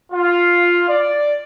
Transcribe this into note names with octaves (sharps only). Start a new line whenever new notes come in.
F4
D5